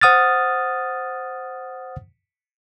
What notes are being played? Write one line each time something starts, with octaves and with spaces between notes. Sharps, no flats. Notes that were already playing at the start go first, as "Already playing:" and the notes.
C5 F#5 D#6 F6 A6